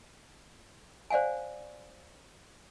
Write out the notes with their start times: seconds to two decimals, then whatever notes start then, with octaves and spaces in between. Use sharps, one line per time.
1.10 C5 D5 F5 F#5 G#5